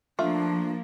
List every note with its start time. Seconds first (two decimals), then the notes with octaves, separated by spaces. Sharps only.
0.19 F3 A3 A#3 D4 F4 E5